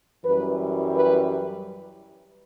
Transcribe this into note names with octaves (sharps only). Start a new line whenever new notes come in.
F#2 E3 G3 B4
B4